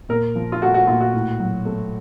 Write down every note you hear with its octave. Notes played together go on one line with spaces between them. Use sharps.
A#2 A#4
F3
F4
A3 F#4
F#4
A#2 F4
F#4
A2
F#3
A3